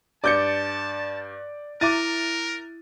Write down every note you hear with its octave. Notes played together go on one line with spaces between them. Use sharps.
G2 D5 A5 D6 G6 C#7
E4 A#4 E5 D6 A6 D#7